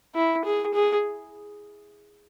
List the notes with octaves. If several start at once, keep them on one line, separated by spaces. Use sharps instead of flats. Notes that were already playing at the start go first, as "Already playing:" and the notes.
E4
G#4
G#4